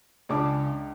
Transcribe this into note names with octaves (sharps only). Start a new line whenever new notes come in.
C#2 C#3 D4 D6